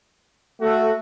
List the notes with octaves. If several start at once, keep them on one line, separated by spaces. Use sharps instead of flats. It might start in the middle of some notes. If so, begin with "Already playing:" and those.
A3 F#4 A4